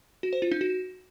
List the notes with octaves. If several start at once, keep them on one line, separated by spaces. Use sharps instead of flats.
F#4
C5
F4
D#4
F#4